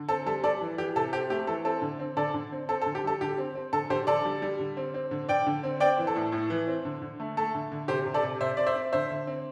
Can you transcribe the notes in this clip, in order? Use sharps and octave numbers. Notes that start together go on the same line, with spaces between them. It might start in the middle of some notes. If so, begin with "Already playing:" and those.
Already playing: D3
C4 A4
G3 A4
G3 A4 D5
E3
E3 G4
C3 A4
C4 G4
A3 G4
E3 A4
C4 A4
D3
C4
D3 A4 D5
D3
C4
C4 A4
A4
D3
G4
G3 A4
D3 G4
C4
C4
D3 A4
D3 G4 C5
D3 A4 D5
G3
G3
D3
C4
C4
D3
D3 D5 G5
D3
C4
C4 D5 G5
E3
A4
A2
A2
E3
C4
D3
D3
A3
A3 A4
D3
D3
C3 G4 C5
C3
A4 D5
C3
C3 C5 E5
C4 D5
C5 E5
C4
D3 C5 E5
D3
C4